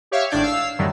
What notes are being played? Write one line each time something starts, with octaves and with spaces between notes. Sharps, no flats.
G4 C#5 E5 F5
G#1 A2 D4 D5 G6 G#6
F5 E6 C7
F#2 A2 D3 D#3 G3